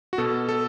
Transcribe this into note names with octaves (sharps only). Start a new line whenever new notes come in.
F#4
B2 A4
A4